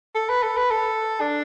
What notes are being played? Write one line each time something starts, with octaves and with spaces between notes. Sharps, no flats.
A4
B4
A4
B4
A4
D4